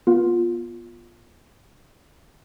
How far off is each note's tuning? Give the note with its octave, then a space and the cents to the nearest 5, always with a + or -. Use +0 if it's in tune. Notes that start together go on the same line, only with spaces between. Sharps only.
B3 -25 F4 +0